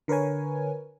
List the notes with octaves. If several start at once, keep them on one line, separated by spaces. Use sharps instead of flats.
D3 A#4 B4 C#5 G#5